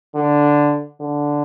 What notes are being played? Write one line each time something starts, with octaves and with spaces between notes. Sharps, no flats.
D3
D3